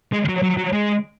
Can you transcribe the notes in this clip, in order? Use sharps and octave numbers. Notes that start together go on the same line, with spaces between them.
G#3
F#3
F#3
F#3
G#3